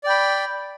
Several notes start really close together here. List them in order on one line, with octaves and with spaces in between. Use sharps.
D5 G5 B5